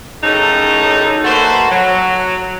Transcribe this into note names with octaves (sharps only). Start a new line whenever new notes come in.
F#2 A2 C#3 D#4 G4 A4
A3 A#3 F#4 A4 B4 C5
F#3